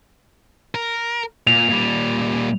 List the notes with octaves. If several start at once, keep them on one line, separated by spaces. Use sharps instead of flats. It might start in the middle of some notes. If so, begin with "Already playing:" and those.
A#4
A#2 F7
A#2 G3